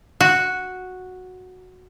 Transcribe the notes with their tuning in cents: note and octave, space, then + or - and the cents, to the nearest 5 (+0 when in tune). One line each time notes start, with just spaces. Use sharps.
F#4 -5